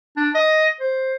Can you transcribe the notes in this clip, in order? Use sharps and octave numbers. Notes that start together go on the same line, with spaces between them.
D4
D#5
C5